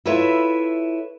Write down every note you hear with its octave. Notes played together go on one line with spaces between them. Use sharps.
E4 F4 A4 B4 C#5 E5